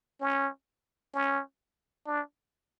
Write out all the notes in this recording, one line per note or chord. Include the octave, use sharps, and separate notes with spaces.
C#4
C#4
D4